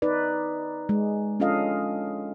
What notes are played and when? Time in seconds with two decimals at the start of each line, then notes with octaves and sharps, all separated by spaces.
0.02 D#4 B4 D5
0.89 G#3
1.40 C#4 D4 F4 A4 D#5 F5